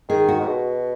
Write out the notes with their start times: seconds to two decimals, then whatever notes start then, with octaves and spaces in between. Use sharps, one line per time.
0.09 D#3 G#4
0.28 F#4
0.40 G#2
0.47 B2